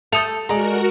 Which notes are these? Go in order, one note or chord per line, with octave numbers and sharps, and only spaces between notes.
A3 A4 D#6 G6 F7
G#3 F#4 A#4 D5 A#5